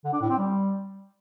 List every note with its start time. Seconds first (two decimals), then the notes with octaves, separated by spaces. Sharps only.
0.05 D3
0.13 D4
0.21 A2
0.30 C4
0.38 G3